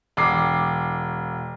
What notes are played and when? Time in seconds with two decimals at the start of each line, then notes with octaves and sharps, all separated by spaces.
0.17 E1 D6 C7